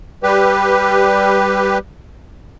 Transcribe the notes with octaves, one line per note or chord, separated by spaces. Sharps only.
G3 G4 B4